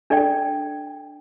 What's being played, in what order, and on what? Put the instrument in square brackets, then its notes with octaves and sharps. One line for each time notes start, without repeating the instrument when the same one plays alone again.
[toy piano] D4 A4 D5 G5